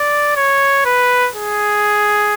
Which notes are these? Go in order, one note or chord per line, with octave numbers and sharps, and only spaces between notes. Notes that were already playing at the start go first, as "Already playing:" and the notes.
Already playing: D5
C#5
B4
G#4